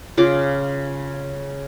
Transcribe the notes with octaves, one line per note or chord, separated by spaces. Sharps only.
C#3 F4 D6